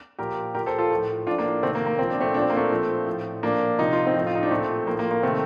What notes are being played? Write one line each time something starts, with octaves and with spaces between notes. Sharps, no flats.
A#2 F3 G4 A#4
A#2 F3 G4 A#4
A4 C5
F4 A4
A2 F3
A2 F3 D4 F4
A#3 D4
C3 D#3 A3 C4
A#3
A#3
A#2 F3 C4
D4
A3 C4
A#2 F3 D4
C4
A#3
A3 C4
A#2 F3
A2 F3
A#2 F3 A#3 D4
C3 F3 D#4
F4
C4 D#4
A2 F3
F4
D#4
D4
A#2 F3 A3 C4
A2 F3 A#3
A#3
A#3
C3 D#3 A3 C4